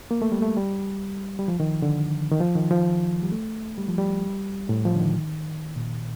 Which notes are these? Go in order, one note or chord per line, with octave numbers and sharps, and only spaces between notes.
A#3
A3
G3
A3
G3
G3
F3
D#3
D3
D#3
F3
D#3
F3
G3
A3
G3
F3
G3
A2
F3
D3
D#3
A#2